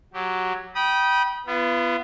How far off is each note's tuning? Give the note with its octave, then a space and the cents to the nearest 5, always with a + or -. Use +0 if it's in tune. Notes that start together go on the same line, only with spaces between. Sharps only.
F#3 +0 G4 -10
G5 -20 B5 -30 D#6 +0
B3 +5 F4 -40